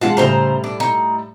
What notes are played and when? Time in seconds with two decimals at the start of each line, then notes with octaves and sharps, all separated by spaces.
0.01 G#3 F4 F5 F#5 A5
0.17 A2 C#3 G3 C5 A#5
0.64 D4
0.80 D#4